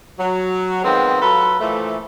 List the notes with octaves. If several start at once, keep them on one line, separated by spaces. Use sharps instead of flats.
F#3
D#3 F3 G#3 B3 C4
F#3 F4 F#4 A4 B4
A#2 E3 F3 A3